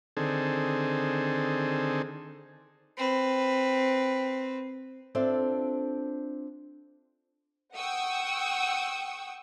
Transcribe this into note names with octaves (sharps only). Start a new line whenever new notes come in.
D3 D#3 C4 G#4 A4
C4 B4
C4 D4 F4 A4 D5 E5
F#5 G5 C#6 D#6 E6